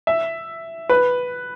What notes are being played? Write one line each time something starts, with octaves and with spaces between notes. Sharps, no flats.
E5
B4